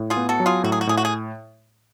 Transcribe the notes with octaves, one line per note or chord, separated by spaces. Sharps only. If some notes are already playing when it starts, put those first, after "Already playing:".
Already playing: A2
F4 G#4
B3
F#4 A4
F#3
F4 G#4
A2 F#4
G#4
F#4
A2 G#4
F#4
G#4